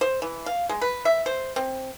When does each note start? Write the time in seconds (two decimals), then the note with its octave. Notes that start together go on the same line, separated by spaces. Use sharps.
0.01 C5
0.22 E3
0.46 F5
0.69 G#3
0.81 B4
1.05 E5
1.26 C5
1.56 C4